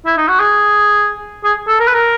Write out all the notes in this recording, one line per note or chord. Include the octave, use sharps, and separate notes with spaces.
E4
D#4
F#4
G#4
G#4
A4
A#4
B4
A#4